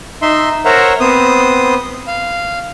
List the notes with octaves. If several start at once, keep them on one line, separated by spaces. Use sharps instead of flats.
D#4 E5 C6
A#4 C5 C#5 E5 F#5 A#5
B3 C4 C5 D#6
F5